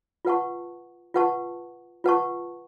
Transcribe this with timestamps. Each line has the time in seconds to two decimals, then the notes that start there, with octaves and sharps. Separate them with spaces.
0.25 F4 B4 F#5 A5 C#6
1.14 F4 B4 F#5 A5 C#6
2.04 F4 B4 F#5 A5 C#6